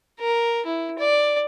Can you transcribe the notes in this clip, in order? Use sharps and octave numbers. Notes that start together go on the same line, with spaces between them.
A#4
E4
D5